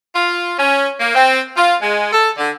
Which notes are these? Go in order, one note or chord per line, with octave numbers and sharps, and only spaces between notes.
F4
C#4
A#3
C4
F4
G#3
A4
D3